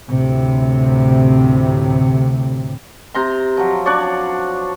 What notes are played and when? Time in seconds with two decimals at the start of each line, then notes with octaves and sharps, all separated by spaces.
0.10 D2 A2 C3
3.14 C3 A#5 C6
3.57 F3 F#3
3.86 D4 C#5 D5